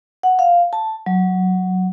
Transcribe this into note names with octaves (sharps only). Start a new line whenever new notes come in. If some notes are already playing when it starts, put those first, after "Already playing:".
F#5
F5
A5
F#3